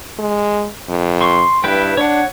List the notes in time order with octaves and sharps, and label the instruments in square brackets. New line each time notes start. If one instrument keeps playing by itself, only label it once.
[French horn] G#3
F2
[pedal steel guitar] C6 C#6
[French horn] G2 [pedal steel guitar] E4 B4 G5
[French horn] D4 [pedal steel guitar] C#5 F#5